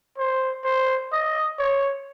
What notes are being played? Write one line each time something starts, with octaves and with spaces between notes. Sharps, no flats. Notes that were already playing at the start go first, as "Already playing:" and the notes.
C5
C5
D#5
C#5